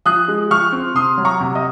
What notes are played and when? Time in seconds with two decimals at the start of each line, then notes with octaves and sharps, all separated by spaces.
0.05 F3 D#6 F#6
0.28 G#3
0.50 F3 C#6 F6
0.72 C4
0.95 C3 C6 D#6
1.18 F#3
1.25 A#5 C#6
1.40 C3
1.55 D#5